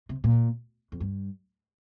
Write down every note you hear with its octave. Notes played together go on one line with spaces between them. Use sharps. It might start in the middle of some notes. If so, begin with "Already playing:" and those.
C3
A#2
F2
G2